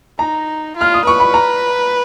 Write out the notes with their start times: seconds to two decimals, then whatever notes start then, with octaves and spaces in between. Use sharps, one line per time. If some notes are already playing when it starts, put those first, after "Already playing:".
0.19 D#4 A#5
0.76 F4 F6
0.94 D#6
1.05 B4 C#6
1.20 B5
1.34 A#5